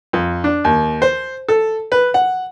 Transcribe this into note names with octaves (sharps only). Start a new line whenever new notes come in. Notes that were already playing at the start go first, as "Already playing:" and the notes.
F2
D4
D#2
C5
A4
B4
F#5